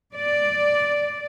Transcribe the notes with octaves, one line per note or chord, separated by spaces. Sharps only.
D5